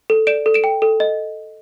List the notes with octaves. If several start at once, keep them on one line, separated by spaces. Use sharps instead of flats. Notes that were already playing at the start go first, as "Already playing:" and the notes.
A4
D5 D7 E7
A4
D7 E7
G5
A4
D#5